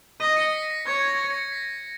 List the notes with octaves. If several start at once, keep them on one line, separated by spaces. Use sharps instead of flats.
D#5 B6 D#7
A#6 C#7
B6
B6
C#5 G#6
A#6
A#6 C#7
B6